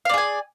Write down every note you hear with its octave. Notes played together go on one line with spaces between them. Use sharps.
G#4 D5 F5 G#5